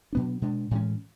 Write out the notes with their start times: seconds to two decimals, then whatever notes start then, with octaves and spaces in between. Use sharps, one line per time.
0.13 B2 F#3 B3 D4
0.42 B2 G#3 D4
0.71 A2 E3 G#3 C#4